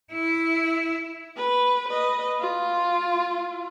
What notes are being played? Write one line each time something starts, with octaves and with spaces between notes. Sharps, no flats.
E4
B4
B4 D#5
F4